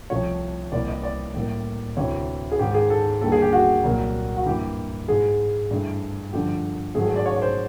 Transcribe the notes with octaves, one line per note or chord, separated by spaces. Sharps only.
C2 C3 F3 A3 C#5
C2 C3 E3 G3 A#3 D5
D#5
D5
A2 E3 G3 A#3
D2 C3 E3 C#5
G#4
G#2 D#3 G#3 G4
G#4
A4
D#2 D3 G3 A#3 A4
G#4
G4
F#4
C2 A#2 F#3 A#3
F#4
G2 E3 G3 A#3 G4
G#2 E3 G#3 G#4
G2 E3 A3
G2 D3 F3 A3 G4
G#2 D#3 F#3 A3 G#4
G#4
D5
C#5
C#5
C5